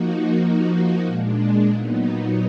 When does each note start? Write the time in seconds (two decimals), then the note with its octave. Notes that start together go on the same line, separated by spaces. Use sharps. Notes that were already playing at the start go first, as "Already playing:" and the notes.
Already playing: F3 A#3 D#4 F#4
0.41 F3 A#3 D#4 F#4
1.05 A#2 G#3 D4
1.71 A#2 F#3 B3 D#4